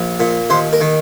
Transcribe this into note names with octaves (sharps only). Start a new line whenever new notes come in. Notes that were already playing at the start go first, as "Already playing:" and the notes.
Already playing: A#1
A#2
D#2 C5
A#4
D#3